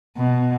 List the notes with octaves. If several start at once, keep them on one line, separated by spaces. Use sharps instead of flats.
B2